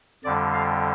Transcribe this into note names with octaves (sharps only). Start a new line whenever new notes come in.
F2 D3 G3 D5
F5